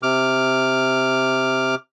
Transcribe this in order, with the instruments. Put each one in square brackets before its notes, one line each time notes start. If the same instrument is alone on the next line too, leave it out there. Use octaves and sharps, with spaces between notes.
[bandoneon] C3 D6 F6